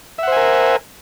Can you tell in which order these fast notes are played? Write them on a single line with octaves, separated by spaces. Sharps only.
E5 F#5 C5 G#5 A#4